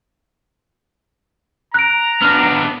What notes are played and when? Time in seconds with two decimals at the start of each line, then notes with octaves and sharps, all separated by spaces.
1.74 A#5 F#6 D7
2.22 B3 D4 F6